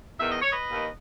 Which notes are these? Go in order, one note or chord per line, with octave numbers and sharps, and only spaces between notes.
E2 D#3 E5
D#5
C#5
B4 D#5
D#2 D#3